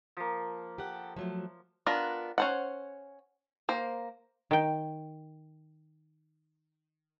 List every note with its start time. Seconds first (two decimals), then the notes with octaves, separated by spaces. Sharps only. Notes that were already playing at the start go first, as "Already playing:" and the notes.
0.17 F3 A#3
0.78 G4 A4 F#5
1.17 F3 F#3 A3
1.86 B3 D4 F4 A#4
2.38 C#4 C5 F#5
3.69 A#3 C5
4.51 D#3 G5